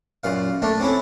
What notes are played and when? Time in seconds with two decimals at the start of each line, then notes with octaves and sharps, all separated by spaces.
0.23 F#2 A#2 F5
0.62 A3 A#3 D4
0.80 C4 C#4 E4 C#5